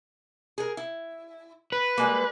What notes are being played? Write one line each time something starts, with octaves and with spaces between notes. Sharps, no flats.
G#4 A#4
E4
B4
G3 G#3 A#3